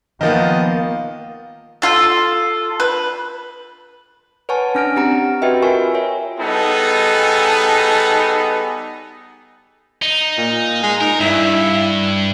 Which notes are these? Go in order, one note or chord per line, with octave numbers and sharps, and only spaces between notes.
D#3 F3 A#3 B3 D#5
F4 A4
B4
B4 C#5 F#5 G#5 A5 C#6
C#4 D4 F6 A#6 D7
C4 G4 F#5 A#5 D7
F#4 G4 B4 D#5 E5 G5
F4 A#4 B4 G#5 C#6
C#5 E5
G3 B3 D#4 G#4 A4
D#4
A#2
G#3
D#4 A#4
G2 E4